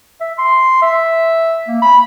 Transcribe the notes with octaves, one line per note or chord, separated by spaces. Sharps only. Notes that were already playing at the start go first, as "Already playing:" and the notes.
E5
C6
E5
A#3
B5